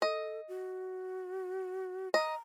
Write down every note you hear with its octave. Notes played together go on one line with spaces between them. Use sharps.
A4 D#5
F#4
D#5 A#5